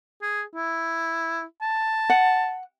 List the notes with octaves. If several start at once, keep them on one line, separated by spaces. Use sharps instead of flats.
G#4
E4
A5
F#5